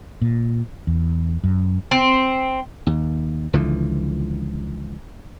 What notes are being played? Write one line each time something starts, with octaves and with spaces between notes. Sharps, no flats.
A#2
E2
F#2
C4
D#2
C#2 D3 E3 F3